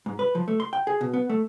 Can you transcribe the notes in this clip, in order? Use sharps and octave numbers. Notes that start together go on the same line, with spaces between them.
G#2
B4
F3
A3
C6
G5
G#4
B2
B3
A3